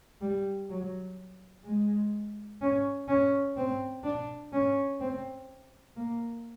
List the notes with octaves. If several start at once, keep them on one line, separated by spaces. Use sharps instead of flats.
G3
F#3
G#3
C#4
C#4
C4
D4
C#4
C4
A#3